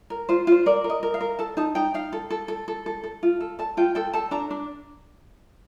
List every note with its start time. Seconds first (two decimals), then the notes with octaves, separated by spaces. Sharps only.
0.10 A#4
0.29 F4 C5
0.47 F4 C5
0.66 A#4 D5
0.84 A#4
0.90 D#5
1.03 A#4
1.14 F5
1.21 A#4
1.39 A4 A5
1.57 D#4 A5
1.75 D#4 G5
1.94 D#4 F5
2.13 A4
2.30 A4
2.48 A4
2.68 A4
2.86 A4
3.04 A4
3.23 F4
3.41 A4
3.59 A4 A5
3.77 F4 G5
3.95 A4 G5
4.13 A4 A5
4.31 D4 A#5
4.50 D4